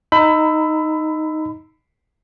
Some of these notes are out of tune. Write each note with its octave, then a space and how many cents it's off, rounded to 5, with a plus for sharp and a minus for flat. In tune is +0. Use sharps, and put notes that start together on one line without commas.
D#4 +0 B5 +25 E6 +0